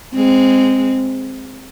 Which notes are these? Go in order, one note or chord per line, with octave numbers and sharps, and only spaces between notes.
G#3 C4